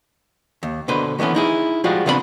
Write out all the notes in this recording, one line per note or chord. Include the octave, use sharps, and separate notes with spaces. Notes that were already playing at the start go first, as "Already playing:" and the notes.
D#2
B2 D3 B4 C5
D#3 E3 A3 B3 C#4
D#4 E4 G#4
F3 G3 G#3 F4 F#4
C#3 B3 C4 D4 B4 B5